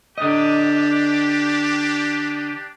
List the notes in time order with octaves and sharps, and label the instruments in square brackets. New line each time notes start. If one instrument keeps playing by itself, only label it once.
[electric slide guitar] D3 D#5 [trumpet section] D4 G4